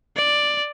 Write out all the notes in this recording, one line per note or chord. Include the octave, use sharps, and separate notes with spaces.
D5